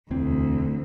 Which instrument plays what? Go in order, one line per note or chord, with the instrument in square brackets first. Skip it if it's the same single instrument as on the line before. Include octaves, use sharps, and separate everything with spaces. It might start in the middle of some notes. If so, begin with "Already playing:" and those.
[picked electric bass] E1 E3 C4 [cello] D2